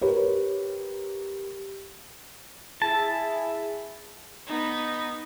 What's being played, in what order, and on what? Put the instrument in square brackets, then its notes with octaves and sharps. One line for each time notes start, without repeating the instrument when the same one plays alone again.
[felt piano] G4 A#4 B4 C#5
[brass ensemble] E4 G#4 E5 [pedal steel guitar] A5
[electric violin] B3 D#4